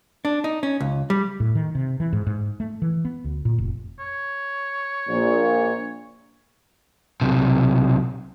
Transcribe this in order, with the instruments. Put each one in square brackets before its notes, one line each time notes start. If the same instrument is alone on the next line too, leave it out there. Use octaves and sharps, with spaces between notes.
[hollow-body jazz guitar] D4
D#4
C#4
C#2
G3
[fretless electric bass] A2
D#3
C3
E3
G#2
G#2
A3
E3
B3
D2
A#2
F1
[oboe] C#5
[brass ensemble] A#1 A#2
[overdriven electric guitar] B1 C3